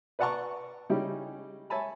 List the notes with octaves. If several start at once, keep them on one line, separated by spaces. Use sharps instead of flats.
B4 D5 F#5 A5 A#5 C#6
C#3 G3 C#4 D#4 E4 G4
C#5 E5 G#5 A5 B5